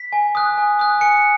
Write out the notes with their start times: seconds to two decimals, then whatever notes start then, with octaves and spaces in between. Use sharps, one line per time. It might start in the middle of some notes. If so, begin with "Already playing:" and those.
Already playing: B6
0.12 G#5
0.35 D#6 F#6
0.57 G#5
0.79 D#6 F#6
1.01 G#5 C#7